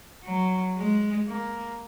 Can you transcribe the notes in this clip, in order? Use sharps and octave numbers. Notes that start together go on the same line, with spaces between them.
F#3
G#3
A#3